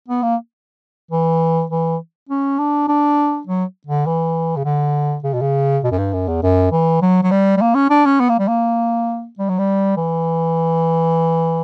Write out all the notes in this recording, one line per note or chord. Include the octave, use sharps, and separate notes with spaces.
B3
A#3
E3
E3
C#4
D4
D4
F#3
D3
E3
C#3
D3
C#3
B2
C#3
B2
F#2
G2
F#2
E2
F#2
E3
F#3
F#3
G3
G3
A#3
C#4
D4
C#4
B3
A#3
G3
A#3
G3
F#3
G3
E3